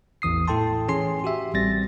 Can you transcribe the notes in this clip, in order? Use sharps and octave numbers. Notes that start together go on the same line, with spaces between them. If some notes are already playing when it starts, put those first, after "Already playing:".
A1 E2 E3 D#6 C7
A2 E4 A4 G5 A5 C6
E3 C#4 G#4 G#5 C6 C7
F#4 G4 E5
A1 G3 C4 A6 A#6